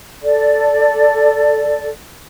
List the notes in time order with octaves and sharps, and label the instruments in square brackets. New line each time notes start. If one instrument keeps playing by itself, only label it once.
[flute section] A4 D5